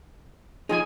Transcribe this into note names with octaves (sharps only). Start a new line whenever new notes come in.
F3 D#4 G#4 G#5